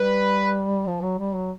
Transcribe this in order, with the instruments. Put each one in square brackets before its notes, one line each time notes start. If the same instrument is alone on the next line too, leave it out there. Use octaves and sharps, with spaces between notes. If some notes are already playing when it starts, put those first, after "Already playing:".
Already playing: [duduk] G3 [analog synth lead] B4
[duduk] F3
F#3
G3
F#3